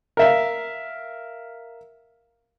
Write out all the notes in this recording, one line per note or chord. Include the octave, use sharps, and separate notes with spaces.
A#4 E5 F5